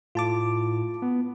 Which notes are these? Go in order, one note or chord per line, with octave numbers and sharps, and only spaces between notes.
A2 F4 A5 D6
B3